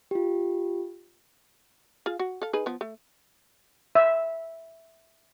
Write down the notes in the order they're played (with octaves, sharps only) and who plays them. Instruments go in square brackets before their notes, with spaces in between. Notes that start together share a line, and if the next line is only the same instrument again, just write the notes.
[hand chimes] F4 G4
[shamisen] F4 G#4 F5
F#4
A4 F5
D#4 G#4 B4
F3 B3
A3
[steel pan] E5